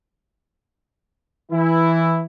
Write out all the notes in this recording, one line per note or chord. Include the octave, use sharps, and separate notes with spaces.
E3 E4